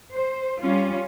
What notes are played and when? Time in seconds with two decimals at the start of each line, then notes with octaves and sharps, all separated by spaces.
0.14 C5
0.63 G3 C#4 F4